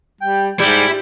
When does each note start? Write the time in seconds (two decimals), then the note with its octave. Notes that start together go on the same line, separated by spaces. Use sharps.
0.21 G3 G5
0.60 G#2 G3 E4 G4